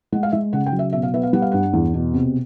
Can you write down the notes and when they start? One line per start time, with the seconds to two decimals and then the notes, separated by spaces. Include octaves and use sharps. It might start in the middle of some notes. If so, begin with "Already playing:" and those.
0.12 G#3 F#5
0.23 F5
0.32 G#3 E5
0.53 C#3 F#5
0.66 G5
0.72 F#3
0.79 E5
0.93 B2 E5
1.03 F5
1.14 B3 E5
1.23 F5
1.33 G3 F#5
1.42 F5
1.52 G2 F#5
1.73 E2
1.94 B2
2.14 C3